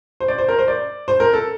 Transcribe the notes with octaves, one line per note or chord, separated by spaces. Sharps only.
C5
D5
C5
A#4
C5
D5
C5
A#4
A4